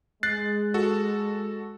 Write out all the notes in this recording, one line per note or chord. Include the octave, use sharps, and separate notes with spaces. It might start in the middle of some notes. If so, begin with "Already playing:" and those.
G#3 F#6 A6 C7
F#4 A4